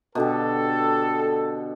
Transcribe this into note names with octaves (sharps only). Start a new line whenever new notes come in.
B2 D3 G4 A4